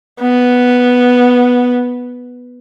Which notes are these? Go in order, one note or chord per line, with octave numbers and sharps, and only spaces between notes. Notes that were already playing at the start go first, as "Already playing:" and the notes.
B3